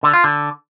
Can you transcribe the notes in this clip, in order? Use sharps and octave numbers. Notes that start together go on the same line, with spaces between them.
D3
F4
D3